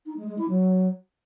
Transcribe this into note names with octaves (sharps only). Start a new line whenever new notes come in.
D#4
G#3
G#3
E4
F#3